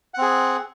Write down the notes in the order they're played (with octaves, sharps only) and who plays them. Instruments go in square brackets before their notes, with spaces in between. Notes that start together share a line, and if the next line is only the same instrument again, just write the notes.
[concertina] F#5
C4
G#4